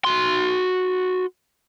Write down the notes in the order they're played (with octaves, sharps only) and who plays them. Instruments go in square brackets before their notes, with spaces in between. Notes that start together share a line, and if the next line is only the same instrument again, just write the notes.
[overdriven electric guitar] F#4 C6